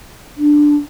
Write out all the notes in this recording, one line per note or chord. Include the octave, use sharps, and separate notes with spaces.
D4